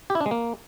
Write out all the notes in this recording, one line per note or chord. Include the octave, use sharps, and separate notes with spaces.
G4
E4
D4
G#3
A#3